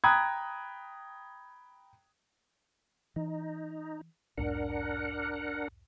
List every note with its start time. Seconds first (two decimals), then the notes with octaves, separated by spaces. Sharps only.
0.04 G5 A#5 B5 D#6 F#6 G#6
3.16 E3 D#4
4.38 B1 E2 G#2 D4 A#4 F#5